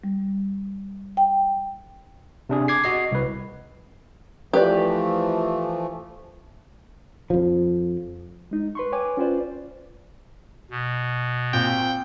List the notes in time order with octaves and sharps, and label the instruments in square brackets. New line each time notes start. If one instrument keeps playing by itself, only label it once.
[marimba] G3
G5
[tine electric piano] C3 D4 G#4
D6 G#6 C7
F#4 D#5 C7
C2 B4
[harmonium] E3 F3 A3 [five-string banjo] G4 B4 D5
[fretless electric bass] F2 F3
[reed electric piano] G#3 D#4
B4 C6 C#6
B4 C#5 G5 G#5 D6
C#4 F4 B4 C5 D5
[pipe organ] B2
[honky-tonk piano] A#2 [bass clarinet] C4 [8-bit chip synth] G5